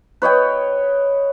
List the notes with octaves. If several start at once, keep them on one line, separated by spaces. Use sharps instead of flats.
B4 C#5 D#5 G5